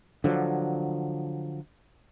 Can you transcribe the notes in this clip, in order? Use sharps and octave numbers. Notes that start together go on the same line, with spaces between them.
D3 F3 F#3